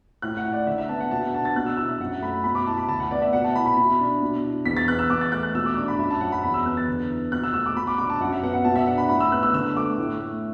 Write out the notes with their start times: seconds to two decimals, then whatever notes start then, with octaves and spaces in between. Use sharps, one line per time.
0.22 A2 F#6
0.37 F#5
0.44 E4
0.52 D5
0.67 D3 E5
0.78 E5
0.89 B3 A5
1.00 F#5
1.11 B2 A5
1.23 F#5
1.34 D4 A5
1.45 A6
1.56 B2 F#6
1.66 E6
1.77 E4 E6
1.89 E5
2.00 F#2 F#5
2.22 A3 B5
2.44 B2 B5
2.55 D6
2.67 E4 A5
2.77 B5
2.89 D2 A5
3.00 F#5
3.11 B3 D5
3.22 E5
3.33 B2 F#5
3.44 A5
3.55 E4 B5
3.66 B5
3.77 B2
4.00 D4
4.22 B2
4.44 E4
4.65 E2 B6
4.77 A6
4.88 B3 F#6
4.99 E6
5.10 E2 D6
5.21 A6
5.32 A3 F#6
5.43 F#6
5.55 B2 E6
5.66 D6
5.77 D4 D6
5.88 B5
5.99 F#2 E5
6.11 A5
6.21 F#3 F#5
6.32 B5
6.43 E2 B5
6.54 E6
6.66 B3 F#6
6.77 A6
6.88 D3
7.10 E4
7.32 B2 F#6
7.44 E6
7.54 A3 E6
7.66 D6
7.76 B2 B5
7.87 D6
7.98 D4 D6
8.10 A5
8.20 F#2 F#5
8.32 E5
8.43 B3 F#5
8.54 F#5
8.65 B2 A5
8.76 E5
8.87 D4 F#5
8.98 B5
9.09 A2 B5
9.20 E6
9.32 B3 F#6
9.43 E6
9.53 D3 E6
9.76 A3 D6
9.98 A2
10.20 A3